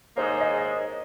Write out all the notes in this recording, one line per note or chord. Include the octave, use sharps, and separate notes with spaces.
G#2 D#3 A#3 D#4 G#4 C5
C#5
D#5